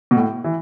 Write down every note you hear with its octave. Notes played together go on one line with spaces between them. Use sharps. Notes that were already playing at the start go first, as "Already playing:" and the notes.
B2
A2
E3